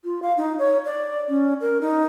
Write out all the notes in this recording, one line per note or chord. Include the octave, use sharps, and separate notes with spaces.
F4
F5
D#4
C#5
D5
C#4
A#4
D#4